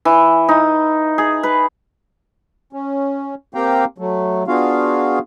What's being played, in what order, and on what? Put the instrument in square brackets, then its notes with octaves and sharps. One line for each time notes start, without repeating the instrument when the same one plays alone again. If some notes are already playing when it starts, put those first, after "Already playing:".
[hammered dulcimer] E3
D#4
G#4
B4
[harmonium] C#4
A#3 C4 G4 F5 G5 A#5
F#3 A3
B3 D4 F4 F#4 G#4 F5